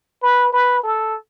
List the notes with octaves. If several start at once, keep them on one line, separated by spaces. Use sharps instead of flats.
B4
B4
A4